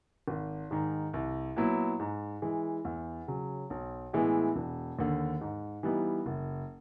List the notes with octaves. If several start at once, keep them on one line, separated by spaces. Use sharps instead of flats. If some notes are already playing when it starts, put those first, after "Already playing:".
G#1
G#2 D#3
C2
A#2 F#3 B3 E4
G#2
E3 G#3
E2
C#3 F#3
B1
A2 E3 G#3 B3
E1
D#2 D3
G#2
E3 G3 B3 D#4
F#1